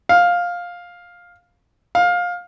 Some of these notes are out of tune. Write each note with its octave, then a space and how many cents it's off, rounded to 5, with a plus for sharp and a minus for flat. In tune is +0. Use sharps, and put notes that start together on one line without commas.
F5 +10
F5 +20